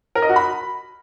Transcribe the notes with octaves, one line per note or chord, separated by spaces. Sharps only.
A#4
D#5
F#4
B5